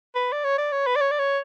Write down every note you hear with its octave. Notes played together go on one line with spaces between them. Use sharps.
B4
D5
C#5
D5
C#5
B4
D5
C#5
D5
C#5